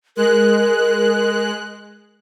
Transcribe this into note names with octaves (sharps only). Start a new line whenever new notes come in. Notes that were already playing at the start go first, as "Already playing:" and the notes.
G#3 A#4 F#6